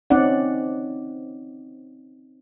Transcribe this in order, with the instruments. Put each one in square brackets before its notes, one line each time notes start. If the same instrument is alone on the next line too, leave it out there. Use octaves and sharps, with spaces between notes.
[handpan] C4 C#4 D#4 D5 F#5